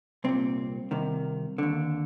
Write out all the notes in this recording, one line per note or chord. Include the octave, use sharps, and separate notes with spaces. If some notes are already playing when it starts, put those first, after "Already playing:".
C2 A#2 C4
C2 C3 D#3
D#2 D3